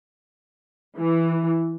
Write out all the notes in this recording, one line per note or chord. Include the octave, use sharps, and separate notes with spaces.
E3